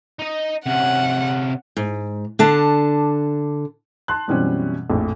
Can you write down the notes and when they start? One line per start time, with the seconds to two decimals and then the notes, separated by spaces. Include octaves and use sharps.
0.19 D#4 D#5
0.66 C3 C#4 F#5
1.77 G#2
2.39 D3 D4 A5
4.08 A5 C6 F#6
4.28 F#2 B2 E3 G3 C4 C#4
4.90 A#1 F2 A2